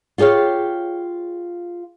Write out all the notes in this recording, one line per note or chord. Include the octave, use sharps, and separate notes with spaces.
F4 G4 G#4 C#5 F5